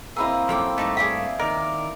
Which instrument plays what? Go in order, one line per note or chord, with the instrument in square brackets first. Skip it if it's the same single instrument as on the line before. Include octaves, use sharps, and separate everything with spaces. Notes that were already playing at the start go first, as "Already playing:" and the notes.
[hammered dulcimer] A#3 C4 E4 [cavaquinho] G#4 B4 D#5 [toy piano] B5 E6
[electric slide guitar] F#2 A#2 F3 [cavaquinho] A4 G5 D6
[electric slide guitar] G2 A3 [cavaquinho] D#4 A5 D6
[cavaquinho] G#4 D5 D#6 [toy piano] F5
[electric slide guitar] D#3 A#4 [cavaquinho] D5 [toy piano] D#5